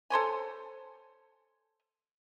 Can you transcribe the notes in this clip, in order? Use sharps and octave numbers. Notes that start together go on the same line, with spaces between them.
A4 C5 C#5 G#5